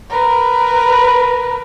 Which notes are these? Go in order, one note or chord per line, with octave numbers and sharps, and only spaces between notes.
A#4 B4